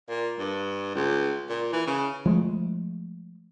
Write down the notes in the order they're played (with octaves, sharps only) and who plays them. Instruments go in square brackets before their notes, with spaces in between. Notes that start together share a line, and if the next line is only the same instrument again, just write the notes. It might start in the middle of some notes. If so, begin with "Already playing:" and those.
[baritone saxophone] A#2
G2
C#2
A#2
E3
C#3
[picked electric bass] F3 G#3 A3